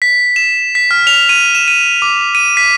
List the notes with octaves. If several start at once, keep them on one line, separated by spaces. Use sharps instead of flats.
B6
E7
B6
F6
F7
D#7
E7
D#7
D6
D#7
B6